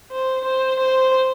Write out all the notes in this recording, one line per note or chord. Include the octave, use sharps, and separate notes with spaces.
C5
C5
C5